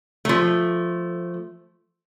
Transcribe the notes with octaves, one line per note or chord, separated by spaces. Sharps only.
F3 A3